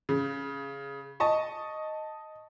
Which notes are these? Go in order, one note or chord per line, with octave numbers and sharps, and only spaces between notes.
C#3
D#5 A5 C#6